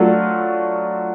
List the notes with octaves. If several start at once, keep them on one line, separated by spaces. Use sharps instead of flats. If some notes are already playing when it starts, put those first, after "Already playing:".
Already playing: F#3 A3 D4 F4